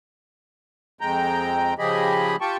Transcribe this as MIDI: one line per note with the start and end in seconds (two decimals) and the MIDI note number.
1.01 1.74 41
1.01 1.74 56
1.01 1.74 79
1.01 1.74 82
1.79 2.36 49
1.79 2.36 53
1.79 2.36 67
1.79 2.36 68
1.79 2.36 75
1.79 2.36 83
2.41 2.57 65
2.41 2.57 67
2.41 2.57 79
2.41 2.57 81
2.41 2.57 85